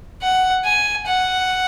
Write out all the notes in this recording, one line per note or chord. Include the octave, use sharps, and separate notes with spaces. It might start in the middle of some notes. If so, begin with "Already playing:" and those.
F#5
G#5
F#5